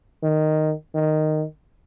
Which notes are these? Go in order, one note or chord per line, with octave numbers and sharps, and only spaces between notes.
D#3
D#3